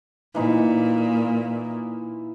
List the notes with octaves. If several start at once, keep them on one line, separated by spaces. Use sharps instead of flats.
A#2 E3 D#4